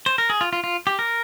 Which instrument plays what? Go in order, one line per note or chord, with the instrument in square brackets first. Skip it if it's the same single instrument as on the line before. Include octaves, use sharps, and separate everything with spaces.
[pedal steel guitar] C5
A#4
G#4
F4
F4
F4
G4
A#4